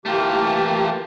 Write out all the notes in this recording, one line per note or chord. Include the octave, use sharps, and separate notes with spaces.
E3 A3 A#3 F4 G4